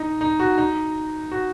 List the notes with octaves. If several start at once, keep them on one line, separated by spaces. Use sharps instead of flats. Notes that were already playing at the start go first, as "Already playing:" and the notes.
Already playing: D#4
D#4
F#4
D#4
F#4